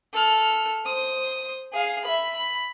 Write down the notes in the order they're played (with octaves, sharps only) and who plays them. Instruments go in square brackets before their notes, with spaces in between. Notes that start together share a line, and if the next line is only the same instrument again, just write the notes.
[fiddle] A4 F6
C5 D#6
G#4 F5
E5 B5
B5